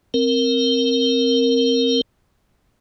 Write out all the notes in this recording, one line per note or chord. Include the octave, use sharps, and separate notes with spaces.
C4 A#4